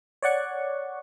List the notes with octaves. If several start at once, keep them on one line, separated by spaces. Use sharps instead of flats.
C#5 D5 F#5 C#6